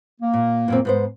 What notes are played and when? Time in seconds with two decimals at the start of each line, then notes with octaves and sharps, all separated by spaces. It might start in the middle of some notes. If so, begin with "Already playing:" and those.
0.21 A#3
0.34 A#2
0.68 F#2 A#2 C4
0.85 G#2 B3 C5